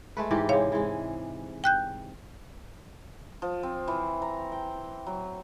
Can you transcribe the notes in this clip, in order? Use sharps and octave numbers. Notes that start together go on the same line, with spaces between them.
G#3 A3 B4
G#2 E3 G4
C3 G#3 C#5 F5
E3 G#3
G5 F#6 G6
F3
C4
E3
A#5
G5
F#3